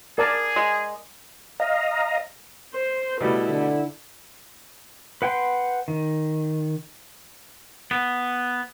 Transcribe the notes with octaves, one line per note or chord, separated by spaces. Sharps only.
G#4 A#4 D5 A5
G#3
D#5 F5 A#5
C5
B2 G3 A3 E4
D3
B4 F#5 G5 C6
D#3
B3